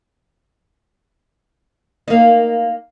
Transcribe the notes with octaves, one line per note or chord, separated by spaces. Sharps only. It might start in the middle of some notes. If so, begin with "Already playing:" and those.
A#3 D#4